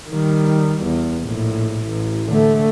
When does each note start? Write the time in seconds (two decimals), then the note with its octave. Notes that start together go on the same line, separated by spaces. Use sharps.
0.10 D#3 G3
0.83 E2
1.24 A#1 A2
1.86 A1
2.28 D3 A3